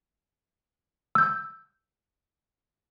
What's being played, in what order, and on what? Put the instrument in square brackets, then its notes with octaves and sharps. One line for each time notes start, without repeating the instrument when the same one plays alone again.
[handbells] E6 G6